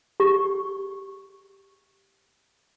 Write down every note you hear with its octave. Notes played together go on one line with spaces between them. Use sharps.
G4 C#6